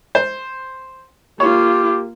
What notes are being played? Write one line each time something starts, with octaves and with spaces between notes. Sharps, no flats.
C5
A#3 F4 G4 C#5